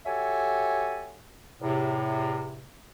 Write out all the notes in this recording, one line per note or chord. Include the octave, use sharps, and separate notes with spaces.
F#4 G4 A4 C#5 E5 G#5
E2 A2 C3